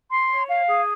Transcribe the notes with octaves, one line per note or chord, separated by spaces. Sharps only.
C6
C#5
F5
G#4